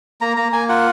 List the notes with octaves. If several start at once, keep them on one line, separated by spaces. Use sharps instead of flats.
A#3 A#5
A#3 A#5
A#3 G#5
F4 F#5